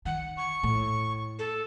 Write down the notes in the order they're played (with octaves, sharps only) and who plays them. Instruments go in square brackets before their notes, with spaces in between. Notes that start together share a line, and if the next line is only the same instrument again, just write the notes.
[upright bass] D#3 [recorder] F#5
[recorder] C#6
[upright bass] A2
[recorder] A4